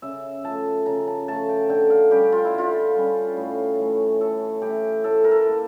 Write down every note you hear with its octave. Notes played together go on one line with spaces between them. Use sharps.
C#3 E5
F3 A3 A5
C#3 A#5
A5
F3 A3 A5
G5
D3 G5
F5
G3 C#4 G4
F4
E4
D3 F4
G3 C#4
A2
E3 A3
A2 A4
E3 A3 G4
A2 A4
A#4
A4
E3 A#3